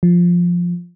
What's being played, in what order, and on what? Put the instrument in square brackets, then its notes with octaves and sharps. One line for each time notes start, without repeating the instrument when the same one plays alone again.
[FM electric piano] F3